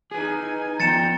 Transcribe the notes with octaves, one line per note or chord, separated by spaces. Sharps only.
D#4 G#4 B4 G#5
F3 B3 G5 A#5 A6 C#7 E7